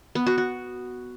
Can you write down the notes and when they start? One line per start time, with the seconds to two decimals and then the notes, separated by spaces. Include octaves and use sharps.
0.15 B3
0.26 F#4
0.38 F#4